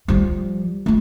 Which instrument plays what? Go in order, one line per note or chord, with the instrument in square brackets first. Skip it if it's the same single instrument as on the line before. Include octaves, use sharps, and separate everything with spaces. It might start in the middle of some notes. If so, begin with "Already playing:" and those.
[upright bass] F3 G3
A3 F4